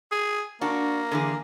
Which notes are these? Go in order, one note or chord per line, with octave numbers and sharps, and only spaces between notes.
G#4
A#3 D4 F#4
D3 E3 G#4